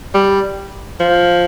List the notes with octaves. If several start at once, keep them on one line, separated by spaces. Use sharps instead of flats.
G3
F3